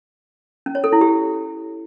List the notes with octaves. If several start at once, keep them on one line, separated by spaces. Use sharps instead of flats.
C#4
C#5
A4
E4
G4